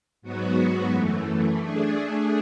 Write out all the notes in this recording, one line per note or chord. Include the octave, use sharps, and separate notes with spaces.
G#2 F#3 B3 F#4
F#2 E3 A3
A3 D4 G#4